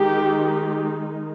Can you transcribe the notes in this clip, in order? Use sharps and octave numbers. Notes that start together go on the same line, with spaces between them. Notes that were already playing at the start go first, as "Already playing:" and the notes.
Already playing: D#3 G#3 D#4 G4